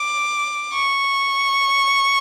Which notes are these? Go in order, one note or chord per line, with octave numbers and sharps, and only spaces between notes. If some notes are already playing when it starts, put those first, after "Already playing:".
Already playing: D6
C#6